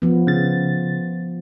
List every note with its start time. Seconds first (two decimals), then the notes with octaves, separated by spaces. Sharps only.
0.02 F3 B3
0.27 C#3 A6